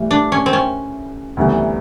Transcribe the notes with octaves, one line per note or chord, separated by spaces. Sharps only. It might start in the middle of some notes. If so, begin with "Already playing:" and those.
Already playing: A2 E3 G3
D4
C#4
C4
C#4
D2 C3 E3 G3 B3